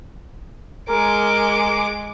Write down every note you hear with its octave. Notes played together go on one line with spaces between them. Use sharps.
G#3 A#4 D6